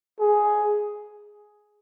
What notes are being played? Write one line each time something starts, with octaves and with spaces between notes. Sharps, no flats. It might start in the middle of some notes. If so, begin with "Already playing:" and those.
G#4